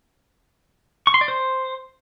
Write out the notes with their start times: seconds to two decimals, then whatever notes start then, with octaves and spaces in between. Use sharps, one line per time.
1.07 C#6
1.14 C6
1.21 D5
1.28 C5